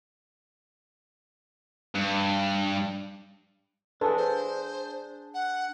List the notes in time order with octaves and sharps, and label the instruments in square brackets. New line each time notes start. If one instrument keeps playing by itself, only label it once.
[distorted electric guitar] G2
[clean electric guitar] D4 G#4 [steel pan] A4 B4
[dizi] C5
F#5